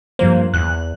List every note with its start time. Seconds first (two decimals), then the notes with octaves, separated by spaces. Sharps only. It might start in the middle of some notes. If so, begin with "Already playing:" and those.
0.19 G2 F3 A#3 C5
0.54 E2 F#6